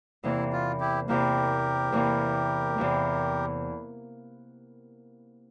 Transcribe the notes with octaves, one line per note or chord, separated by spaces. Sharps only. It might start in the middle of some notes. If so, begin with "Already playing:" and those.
E2 C3 E3 A#3 E4
F4
E4 G4
E2 C3 E3 A#3 G4 A#4
E2 C3 E3 A#3
E2 C3 E3 A#3